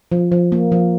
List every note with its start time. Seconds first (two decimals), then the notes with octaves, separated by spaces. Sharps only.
0.12 F3
0.32 F3
0.52 A#3
0.72 F3